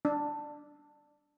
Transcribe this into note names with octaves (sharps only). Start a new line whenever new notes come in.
D4